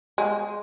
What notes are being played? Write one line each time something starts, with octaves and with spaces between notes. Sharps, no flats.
G#3